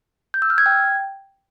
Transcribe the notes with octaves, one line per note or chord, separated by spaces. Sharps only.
G6
E6
F6
G#6
G5